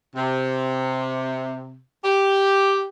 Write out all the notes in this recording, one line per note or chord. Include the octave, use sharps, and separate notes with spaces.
C3
G4